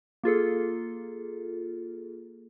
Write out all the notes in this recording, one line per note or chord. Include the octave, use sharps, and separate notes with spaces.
A#3 F4 G#4 A4